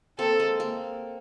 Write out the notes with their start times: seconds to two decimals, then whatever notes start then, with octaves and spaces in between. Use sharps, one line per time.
0.19 A#3 C4 A4
0.40 G#3
0.60 A#3